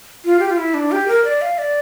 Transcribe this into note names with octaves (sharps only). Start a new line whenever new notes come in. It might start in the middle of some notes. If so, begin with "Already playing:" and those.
F4
G4
F4
E4
D4
G4
A#4
D5
F5
D5